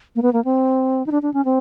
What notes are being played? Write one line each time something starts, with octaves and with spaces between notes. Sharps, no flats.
A#3
B3
A#3
C4
D#4
D4
D4
C#4
C4